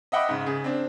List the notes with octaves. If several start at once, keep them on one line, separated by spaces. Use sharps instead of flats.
D#5 E5 F#5 G5 B5 D6
G#2 C#3
C#3 G#4
C4 D4